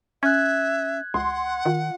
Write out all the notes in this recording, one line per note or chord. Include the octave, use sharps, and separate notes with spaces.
C#4 E5 F#6 G#6
C#2 F#5 C6
D#3 F4